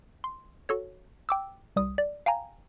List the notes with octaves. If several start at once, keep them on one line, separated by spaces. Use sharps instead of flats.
C6
F#4 A4 C#5
G5 D6 E6
C2 G3 D#6
D5
F5 G5 G#5 A#5